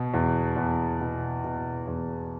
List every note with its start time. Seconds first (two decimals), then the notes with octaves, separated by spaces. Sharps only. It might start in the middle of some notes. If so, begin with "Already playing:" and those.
Already playing: B2
0.14 E2
0.56 E2
1.01 B2
1.44 B2
1.87 E2